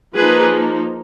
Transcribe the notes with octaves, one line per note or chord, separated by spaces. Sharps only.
F3 A#3 D#4 G#4 B4